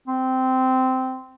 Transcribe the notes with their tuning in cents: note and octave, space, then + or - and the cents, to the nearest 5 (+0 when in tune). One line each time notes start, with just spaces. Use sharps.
C4 -15